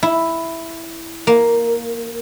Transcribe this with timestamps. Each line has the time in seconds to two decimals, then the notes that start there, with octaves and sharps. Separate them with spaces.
0.03 E4
1.27 A#3